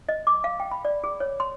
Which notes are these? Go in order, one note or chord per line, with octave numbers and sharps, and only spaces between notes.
D#5
D6
F5
G5
B5
D5
G#4
C#5
C6